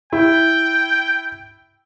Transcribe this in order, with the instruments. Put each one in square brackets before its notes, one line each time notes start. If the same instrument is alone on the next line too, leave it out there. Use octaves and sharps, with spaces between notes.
[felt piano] E4 [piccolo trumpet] G5